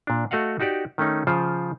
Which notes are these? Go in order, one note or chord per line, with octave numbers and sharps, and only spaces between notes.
A#2 D4
A3 F#4 D#5 F5 F#5
D#4 F#4 G4 D5
D#3 A3 C#4 D#4
C#3 F3 F4 C5